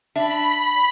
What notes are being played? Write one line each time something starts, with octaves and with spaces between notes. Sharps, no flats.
D4 E5 B5